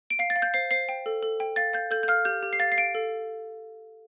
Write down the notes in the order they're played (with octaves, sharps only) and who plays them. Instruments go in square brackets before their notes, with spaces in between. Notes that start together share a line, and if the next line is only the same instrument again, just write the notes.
[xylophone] D7
F5 C7
A6
F5
G6
C5 C7
C5 C7
G5
A4
A4
G5
F5 A6
F5 G6
A4 G6
G6
F5 F6
G4 G6
G4
C7
F5 A6
C7
F5 D7
A4